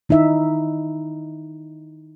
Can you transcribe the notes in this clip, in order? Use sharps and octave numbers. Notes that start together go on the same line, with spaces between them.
D#3 D#4 E4 E5